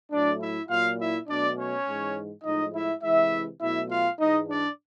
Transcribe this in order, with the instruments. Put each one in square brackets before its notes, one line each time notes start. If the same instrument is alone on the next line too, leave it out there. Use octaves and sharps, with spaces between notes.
[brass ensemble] A2 F#3 A3 D4 D5
E4 E5
A#2 F#3 A#3 F4 F5
E4 E5
B2 F#3 A3 D4 D5
C#4 C#5
G#2 E3 G#3
A2 F3 G#3 D#4 D#5
E4 E5
C3 E3 G#3 E4 E5
B2 F#3 A3 E4 E5
F4 F5
G#2 E3 G#3 D#4 D#5
D4 D5